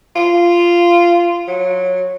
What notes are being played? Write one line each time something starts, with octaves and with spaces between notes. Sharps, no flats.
F4
F#3